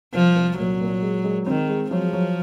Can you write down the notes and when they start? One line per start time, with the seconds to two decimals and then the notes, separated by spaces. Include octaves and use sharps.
0.14 C2 F3
0.36 C2
0.58 A#2 F#3
0.81 A#2
1.02 G#3
1.24 G#3
1.46 D#3 C4
1.69 G#3
1.91 F3 F#3
2.13 F#3